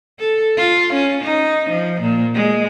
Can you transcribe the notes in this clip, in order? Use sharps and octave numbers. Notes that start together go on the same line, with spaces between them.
A4
F4
C#4
D#4
F3
A#2
G#3